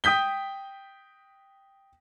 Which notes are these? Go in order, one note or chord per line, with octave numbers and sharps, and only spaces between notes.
G5 D#6 G6 B6 G7